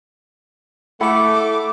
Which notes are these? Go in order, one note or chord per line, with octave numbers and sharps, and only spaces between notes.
A3 E4 F#5 B5 D6